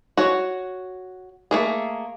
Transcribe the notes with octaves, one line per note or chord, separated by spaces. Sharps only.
F#4 C#5
A3 A#3 G#4